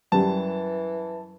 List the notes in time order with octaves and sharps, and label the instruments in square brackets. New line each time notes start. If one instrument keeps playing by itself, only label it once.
[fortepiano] F#2 G3 [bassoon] E3 [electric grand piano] A5